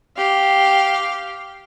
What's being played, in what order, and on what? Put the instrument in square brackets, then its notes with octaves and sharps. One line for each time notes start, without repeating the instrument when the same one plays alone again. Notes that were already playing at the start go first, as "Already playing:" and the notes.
[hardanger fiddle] G4 F5